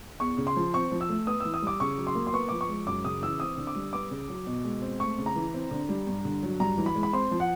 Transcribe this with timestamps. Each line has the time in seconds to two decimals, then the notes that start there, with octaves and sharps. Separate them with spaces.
0.20 E2 C#6
0.38 C#3
0.47 C6
0.56 F3
0.74 C4 C#6
0.91 F3
1.01 E6
1.09 A3
1.27 B3 D#6
1.40 E3 E6
1.54 D#6
1.62 G3 D6
1.80 C#3 C#6
1.98 F#3
2.07 C6
2.15 A#3
2.27 C6
2.33 B3 C#6
2.49 F3 D6
2.61 C#6
2.69 G#3
2.87 F#2 D6
3.05 C#3 D#6
3.22 E3 E6
3.40 C4 D#6
3.57 D3
3.67 D6
3.75 G3
3.93 B3 D6
4.11 C#3
4.29 F#3
4.47 B2
4.65 G#3
4.82 C4
5.00 A3 C#6
5.18 C#3
5.26 A#5
5.36 E3
5.54 C4
5.71 D3
5.89 G3
6.07 G2
6.25 D3
6.43 F#3
6.60 G2 A#5
6.78 E3
6.86 B5
6.95 G#3
7.03 B5
7.13 C4 C6
7.31 F3
7.40 F#5